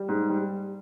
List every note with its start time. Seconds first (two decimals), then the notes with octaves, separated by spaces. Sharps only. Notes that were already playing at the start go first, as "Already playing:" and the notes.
Already playing: G3
0.08 G#2
0.29 G3